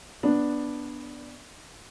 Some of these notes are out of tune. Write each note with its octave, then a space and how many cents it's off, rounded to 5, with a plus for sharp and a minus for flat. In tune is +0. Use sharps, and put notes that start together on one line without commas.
B3 -5 D4 +0